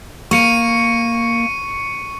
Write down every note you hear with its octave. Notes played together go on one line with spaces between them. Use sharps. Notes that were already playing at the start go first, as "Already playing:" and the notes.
A#3 C#6 C#7 D#7